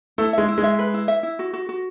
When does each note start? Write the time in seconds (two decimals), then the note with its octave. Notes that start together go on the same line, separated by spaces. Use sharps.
0.18 A3 E4
0.33 G#3 E5
0.48 E4
0.58 G#3
0.64 E5
0.79 B4
0.94 E4
1.08 E5
1.23 E4
1.39 F#4
1.53 F#4
1.69 F#4